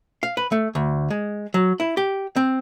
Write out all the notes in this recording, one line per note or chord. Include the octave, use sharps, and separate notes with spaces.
F5
B4
A3
D2
G#3
F#3
E4
G4
C4